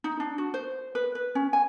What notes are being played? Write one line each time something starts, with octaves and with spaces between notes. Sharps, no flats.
D#4
D4
F#4
C5
B4
B4
C#4
G#5